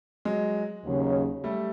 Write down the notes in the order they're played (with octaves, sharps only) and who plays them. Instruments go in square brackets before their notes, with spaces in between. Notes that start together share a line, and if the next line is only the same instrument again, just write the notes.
[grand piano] F#3 G#3
[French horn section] D#2 C#3 F#3
[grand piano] G3 A3